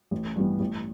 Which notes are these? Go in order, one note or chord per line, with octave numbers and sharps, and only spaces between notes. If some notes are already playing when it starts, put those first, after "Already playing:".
A1
G2 E3 G3 B3
A1